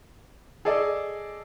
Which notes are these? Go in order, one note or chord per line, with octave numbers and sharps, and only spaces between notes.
G#4 A4 D5 D#5